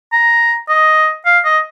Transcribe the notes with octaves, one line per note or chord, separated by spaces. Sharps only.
A#5
D#5
F5
D#5